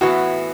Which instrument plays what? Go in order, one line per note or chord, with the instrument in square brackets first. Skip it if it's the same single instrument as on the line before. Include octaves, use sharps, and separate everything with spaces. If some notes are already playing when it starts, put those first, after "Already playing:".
[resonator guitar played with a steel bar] A2 E3 B3 [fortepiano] F#4